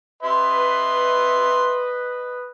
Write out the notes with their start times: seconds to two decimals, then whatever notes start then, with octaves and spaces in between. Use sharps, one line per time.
0.23 B4 D#5 E5 C6